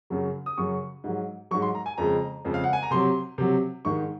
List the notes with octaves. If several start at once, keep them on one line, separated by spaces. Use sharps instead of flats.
F#2 C#3 F#3
D#6
F#2 C#3 F#3 C#6
G#2 F#3
G#2 F#3 C#6
C6
A#5
G#5
F2 C#3 G#3 A#5
F2 C#3 G#3
F5
F#5
G#5
A#5
C3 F#3 C6
C3 F#3
G#2 D#3 G#3 C#6